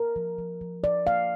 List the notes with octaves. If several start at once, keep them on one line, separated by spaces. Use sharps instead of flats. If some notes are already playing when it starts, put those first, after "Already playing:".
Already playing: A#4
F3
F3
F3
F3 D5
A#3 F5